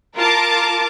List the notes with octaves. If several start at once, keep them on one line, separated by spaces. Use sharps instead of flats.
F4 A#4 A5 D6